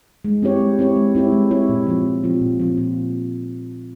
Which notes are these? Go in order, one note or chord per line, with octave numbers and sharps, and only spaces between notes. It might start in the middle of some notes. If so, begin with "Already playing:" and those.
G#3
C4 E4 G4 C#5
G#3
C4 E4 G4 C#5
G#3
C4 E4 G4 C#5
G#3
C4 E4 G4 C#5
A#2
F3 C4 F4
A#2
F3 C4 F4
A#2
F3 C4 F4
A#2